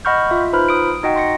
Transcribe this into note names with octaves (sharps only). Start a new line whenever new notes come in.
D#5 F#5 B5 C#6 F6 G6
F4 E5
D#4 F4 B4 C5 B5 F6
D#6 D7
D#4 F#4 D#5 F#5 G5
C6 A#6 C#7